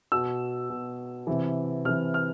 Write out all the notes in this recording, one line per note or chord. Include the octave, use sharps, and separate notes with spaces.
B2 E6
B2
C3 E3
C3 E3 F6
F6